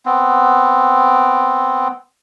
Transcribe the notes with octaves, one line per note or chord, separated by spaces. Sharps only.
B3 C4